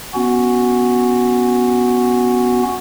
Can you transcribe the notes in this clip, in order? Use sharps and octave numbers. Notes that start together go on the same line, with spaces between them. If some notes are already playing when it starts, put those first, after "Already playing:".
B3 C#4 F#4